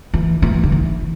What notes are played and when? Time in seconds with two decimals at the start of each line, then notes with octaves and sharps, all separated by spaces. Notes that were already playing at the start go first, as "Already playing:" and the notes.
0.14 E3
0.42 E3
0.63 D3
0.72 E3